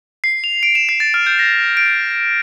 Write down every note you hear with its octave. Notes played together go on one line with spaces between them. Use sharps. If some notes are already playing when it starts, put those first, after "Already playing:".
C7
F7
D7
E7
C7
A6
F6
G6
A#6
D7